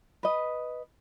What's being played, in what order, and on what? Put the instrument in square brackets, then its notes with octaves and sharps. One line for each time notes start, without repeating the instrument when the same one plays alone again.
[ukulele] B4 D#5